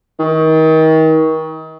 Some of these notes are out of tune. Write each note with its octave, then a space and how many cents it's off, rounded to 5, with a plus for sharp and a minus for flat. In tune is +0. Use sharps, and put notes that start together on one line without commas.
D#3 +35